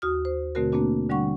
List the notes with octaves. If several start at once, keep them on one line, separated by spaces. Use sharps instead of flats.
D#2 F#4 D#6 F6
C5
B2 D3 A3 C4 F#4 A#4
A3 A#3 C4 D4 F#4
D3 G3 D4 F#5 C#6